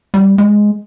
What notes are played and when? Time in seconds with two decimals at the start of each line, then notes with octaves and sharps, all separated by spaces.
0.14 G3
0.38 G#3